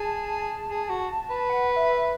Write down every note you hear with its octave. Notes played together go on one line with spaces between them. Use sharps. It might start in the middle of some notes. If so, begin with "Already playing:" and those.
Already playing: G#4 A5
G#4
F#4
B4
F#5
E5